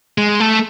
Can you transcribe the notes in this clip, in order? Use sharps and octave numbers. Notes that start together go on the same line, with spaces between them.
G#3
A3